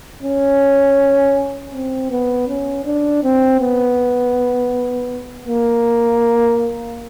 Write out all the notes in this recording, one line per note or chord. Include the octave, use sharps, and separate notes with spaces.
C#4
C4
B3
C#4
D4
C4
B3
A#3